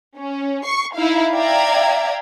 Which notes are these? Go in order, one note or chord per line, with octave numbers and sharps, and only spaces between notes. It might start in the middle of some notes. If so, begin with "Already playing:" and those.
C#4
C#6 C7
D#4 E4 F5
D5 E5 F5 G5 A#5 G#6